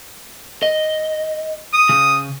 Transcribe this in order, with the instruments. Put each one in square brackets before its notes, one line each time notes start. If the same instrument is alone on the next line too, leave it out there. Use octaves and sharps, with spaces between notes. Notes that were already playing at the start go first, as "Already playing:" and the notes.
[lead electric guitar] D#5
[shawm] D#6
[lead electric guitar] C#3